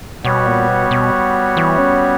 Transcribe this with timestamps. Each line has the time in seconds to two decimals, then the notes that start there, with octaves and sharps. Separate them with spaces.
0.24 B2 G3 B3 F#4 C#5
0.46 A#2
0.69 B2
0.91 B2
1.57 E3
1.78 C#4